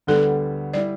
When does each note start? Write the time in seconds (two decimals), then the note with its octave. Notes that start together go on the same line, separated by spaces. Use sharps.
0.07 D2 D3 G3 B3 A4
0.74 G3 E4 D5